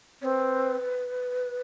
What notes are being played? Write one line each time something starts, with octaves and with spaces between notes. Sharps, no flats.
C4 B4 C#5